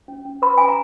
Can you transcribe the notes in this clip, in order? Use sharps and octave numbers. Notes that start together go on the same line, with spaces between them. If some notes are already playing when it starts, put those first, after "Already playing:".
C#4
C#4
B4 B5
C#4 G#5
A#5